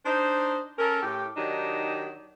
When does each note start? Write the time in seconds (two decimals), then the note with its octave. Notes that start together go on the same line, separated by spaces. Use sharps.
0.06 D4 D#4 C5
0.79 C#4 A4 A#4
1.03 A2 G4
1.37 D#3 F#3 D4 D#4 G4